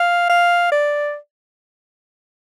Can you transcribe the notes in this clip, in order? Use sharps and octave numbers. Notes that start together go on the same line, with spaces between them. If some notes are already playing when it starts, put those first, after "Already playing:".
Already playing: F5
F5
D5